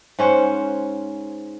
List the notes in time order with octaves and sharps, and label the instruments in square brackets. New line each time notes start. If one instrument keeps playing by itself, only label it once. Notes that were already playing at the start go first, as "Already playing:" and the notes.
[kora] G#2 C#4 C5 F#5